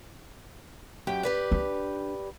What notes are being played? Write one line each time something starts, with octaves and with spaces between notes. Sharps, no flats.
F#2 G4 G5
G4 B4 D5
D4